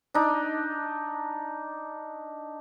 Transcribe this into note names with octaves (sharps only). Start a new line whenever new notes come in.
D4 D#4